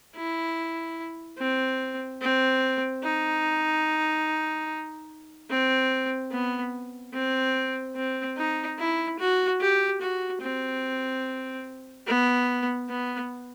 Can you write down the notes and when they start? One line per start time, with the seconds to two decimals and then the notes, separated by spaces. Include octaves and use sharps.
0.16 E4
1.38 C4
2.22 C4
3.03 D#4
5.50 C4
6.32 B3
7.13 C4
7.96 C4
8.37 D#4
8.79 E4
9.19 F#4
9.61 G4
10.01 F#4
10.42 C4
12.07 B3
12.89 B3